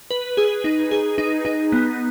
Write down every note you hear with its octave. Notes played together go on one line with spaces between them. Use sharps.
B4
G#4
D#4
G#4
D#4
D#4
B3